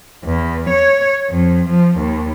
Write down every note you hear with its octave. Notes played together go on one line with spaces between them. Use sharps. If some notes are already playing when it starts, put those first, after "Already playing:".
E2
C#5
F2
F3
D#2